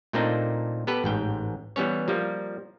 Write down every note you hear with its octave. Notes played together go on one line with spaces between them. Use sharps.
A#2 A3 A#3 C4 D4 D#4
B3 G4 A4 B4
A1 G#2 G5
E3 G3 B3 C#4 C#5
F3 G3 A#3